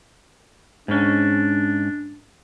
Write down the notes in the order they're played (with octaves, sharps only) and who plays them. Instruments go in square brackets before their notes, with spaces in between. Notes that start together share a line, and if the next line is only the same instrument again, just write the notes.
[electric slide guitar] G#2 C#4 [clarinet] D4